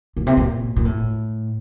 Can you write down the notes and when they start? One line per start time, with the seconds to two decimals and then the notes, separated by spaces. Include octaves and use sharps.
0.17 A#2
0.27 C3
0.37 A#2
0.76 A#2
0.85 A2